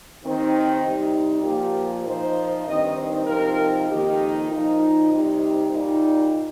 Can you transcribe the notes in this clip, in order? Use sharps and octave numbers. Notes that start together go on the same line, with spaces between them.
D#2 D#3 C4 D#4
C3 G3 D#4
A#2 F3 A#3 G4
A#2 F3 D#4 C5
G2 D#3 C4 D#4 D#5
C5
C3 F3 C4 D#4 A#4
F2 D#3 A#3 D#4 G4
A#2 F3 D#4
C3 G3 D#4
A#2 G3 D#4